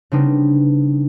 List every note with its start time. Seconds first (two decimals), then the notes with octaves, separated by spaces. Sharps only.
0.12 C#3 G3 B3 C4 D4 D#4